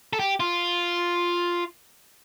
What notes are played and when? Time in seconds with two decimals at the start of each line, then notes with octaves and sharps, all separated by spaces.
0.13 A4
0.19 G4
0.40 F4